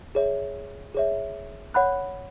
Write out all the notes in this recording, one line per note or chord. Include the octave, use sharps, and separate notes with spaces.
G#4 C#5 E5
G#4 C#5 E5
C#5 F#5 B5 F#6